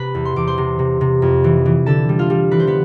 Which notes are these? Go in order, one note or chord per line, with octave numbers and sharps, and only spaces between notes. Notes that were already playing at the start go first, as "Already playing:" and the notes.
Already playing: C3 B4 B5
E2
C6
E2 D6
C5 C6
C3
C3
C3
F2
E3
E3
D3 A4 A5
G3
F4 F5
G3
E3 B4
C5
B3 B4